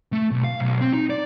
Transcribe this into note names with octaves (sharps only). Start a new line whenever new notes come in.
A3
B1
F5
B1
C4
D#4
D5